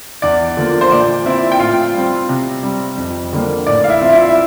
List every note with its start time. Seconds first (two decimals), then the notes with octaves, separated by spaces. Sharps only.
0.22 E2 D5
0.57 D3 F3 A#3
0.81 C5
0.91 A#2 D5
1.26 F3 C4 E4 E5
1.52 G5
1.60 A2 F4 F5
1.94 G3 C4
2.29 C3
2.63 G3 C4
2.97 F2
3.33 D3 G3 A#3
3.67 A2 D5
3.84 F5
3.89 E4 E5
4.01 F3 C4
4.12 E4 E5
4.29 E5